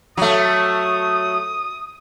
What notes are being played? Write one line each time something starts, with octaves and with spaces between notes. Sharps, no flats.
F#3 A3 D#6